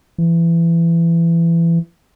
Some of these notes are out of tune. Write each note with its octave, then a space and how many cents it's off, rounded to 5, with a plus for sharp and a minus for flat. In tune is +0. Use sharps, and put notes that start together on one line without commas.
E3 +25